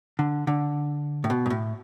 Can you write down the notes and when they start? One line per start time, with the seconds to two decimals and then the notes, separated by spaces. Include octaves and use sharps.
0.19 D3
0.47 D3
1.24 A2
1.30 B2
1.46 G#2
1.50 A2